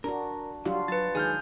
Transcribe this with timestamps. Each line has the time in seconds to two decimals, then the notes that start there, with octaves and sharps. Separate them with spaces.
0.04 D4 F#4 A#4
0.65 F#3 G3 D4 F4 F#4
0.88 F#3 B4 A6
1.15 D#3 F#3 G#3 G#4 G#5 F6 G6